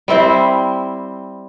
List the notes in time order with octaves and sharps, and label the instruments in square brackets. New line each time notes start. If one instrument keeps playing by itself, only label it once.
[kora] G3 C4 E4 C5